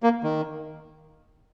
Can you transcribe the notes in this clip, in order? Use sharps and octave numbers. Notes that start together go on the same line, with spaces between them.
A#3
D#3